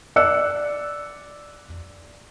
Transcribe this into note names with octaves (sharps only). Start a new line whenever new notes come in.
D5 E6 F#6 C#7